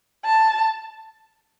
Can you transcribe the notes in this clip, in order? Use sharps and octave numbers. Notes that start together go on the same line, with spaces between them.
A5